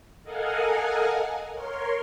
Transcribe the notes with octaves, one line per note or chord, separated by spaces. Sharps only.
A4 A#4 D#5 F5 F#5 G#5
A#4 C#5 C6